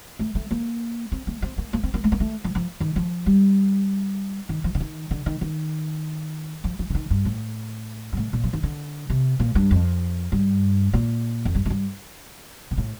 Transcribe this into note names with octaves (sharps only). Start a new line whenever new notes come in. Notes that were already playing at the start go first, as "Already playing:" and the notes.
A3
A3
A#3
C4
A#3
C4
A#3
A#3
C4
A#3
A3
A#3
A3
F3
F3
D#3
F3
G3
D#3
F3
D3
D#3
D3
D#3
D#3
F3
F3
D3
D#3
G2
A2
G2
A2
A#2
F3
D#3
D3
C3
A#2
G2
F2
G2
A#2
F2
G2
A2
G2
A#2
A2